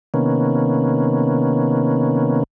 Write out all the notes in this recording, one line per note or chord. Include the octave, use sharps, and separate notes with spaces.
C3 D#3 A#3 B3 C#4